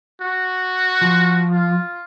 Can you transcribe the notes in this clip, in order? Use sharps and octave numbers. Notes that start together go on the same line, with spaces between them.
F#4
F3
F4